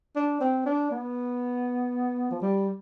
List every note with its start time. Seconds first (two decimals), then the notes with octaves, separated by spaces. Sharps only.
0.16 D4
0.40 C4
0.66 D4
0.91 B3
2.31 F3
2.41 G3